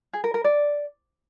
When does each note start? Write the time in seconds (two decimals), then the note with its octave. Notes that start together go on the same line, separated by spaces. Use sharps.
0.13 G#4
0.24 A#4
0.34 A#4
0.44 D5